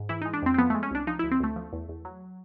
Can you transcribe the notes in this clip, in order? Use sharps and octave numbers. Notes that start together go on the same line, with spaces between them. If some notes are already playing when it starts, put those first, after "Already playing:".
Already playing: G#2
E3 E4
D#4
G#3
D4
F2 C4
C4
F3 B3
A3
G#3
C#4
C2 D4
F3 D#4
E4
D2
C4
D2 A3
F3
E2
E2
F#3